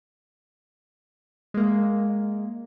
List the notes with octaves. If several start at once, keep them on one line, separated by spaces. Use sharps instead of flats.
G#3 A#3